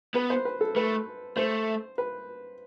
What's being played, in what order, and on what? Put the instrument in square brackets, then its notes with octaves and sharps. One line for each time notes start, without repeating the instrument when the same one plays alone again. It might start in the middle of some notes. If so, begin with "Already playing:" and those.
[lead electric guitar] B3 [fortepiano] B4
[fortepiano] C5
B4
A4
[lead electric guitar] A3 [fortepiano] B4
[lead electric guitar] A3 [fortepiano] C5
[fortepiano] B4